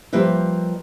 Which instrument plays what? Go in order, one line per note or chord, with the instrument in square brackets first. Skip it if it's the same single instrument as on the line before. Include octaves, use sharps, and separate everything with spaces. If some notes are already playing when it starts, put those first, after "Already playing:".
[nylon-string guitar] F3 G3 A#3 B4 D#5 E5